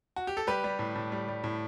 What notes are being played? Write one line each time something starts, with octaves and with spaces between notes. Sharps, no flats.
F#4
G4
A4
G3 G4 B4
G3
A2
A2
G3
G3
A2